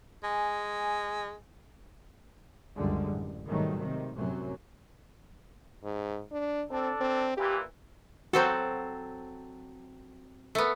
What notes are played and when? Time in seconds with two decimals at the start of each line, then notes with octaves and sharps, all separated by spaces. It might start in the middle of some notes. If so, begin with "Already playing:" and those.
0.23 G#3 G#5
2.76 C#2 F#2 D3 G3 G#3
3.07 A1
3.46 G#2 B2 D#3 F#3 G3 A3
3.78 C3 D#3
4.16 F#2 A2 C3 F#3
5.84 G#2
6.32 D4
6.71 C4 D4 A4
7.01 C4
7.37 A#2 E3 G4
8.33 F#3 C4 F#4 A4 C5
10.55 A3 B3